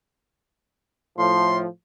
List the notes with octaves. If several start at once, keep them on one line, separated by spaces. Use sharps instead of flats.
A2 F3 C6